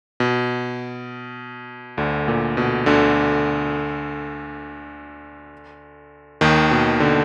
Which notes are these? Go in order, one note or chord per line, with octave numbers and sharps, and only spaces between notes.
B2
D2 D3
A#2
B2
D2 D3
D#2 D#3
B2
D3